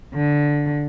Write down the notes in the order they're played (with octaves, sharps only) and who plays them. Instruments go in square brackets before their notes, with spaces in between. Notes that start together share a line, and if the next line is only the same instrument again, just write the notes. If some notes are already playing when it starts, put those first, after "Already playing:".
[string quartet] D3